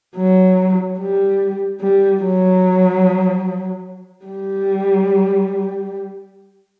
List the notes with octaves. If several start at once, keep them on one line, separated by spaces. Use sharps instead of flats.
F#3
G3
G3
F#3
G3